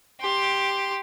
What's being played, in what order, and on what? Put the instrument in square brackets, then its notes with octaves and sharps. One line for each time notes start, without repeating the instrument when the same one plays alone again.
[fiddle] G4 C6